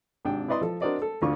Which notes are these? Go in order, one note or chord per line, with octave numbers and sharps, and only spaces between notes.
G#1 C3 D4 G5
E4 B4 D5 D#5 C6
F3 A4
D4 F#4 A#4 C5 D5 D#5
A4
D2 D3 F4 C#6